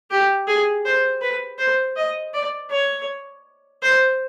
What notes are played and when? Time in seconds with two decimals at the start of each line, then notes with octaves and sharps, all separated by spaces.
0.11 G4
0.47 G#4
0.85 C5
1.22 B4
1.58 C5
1.96 D#5
2.34 D5
2.71 C#5
3.82 C5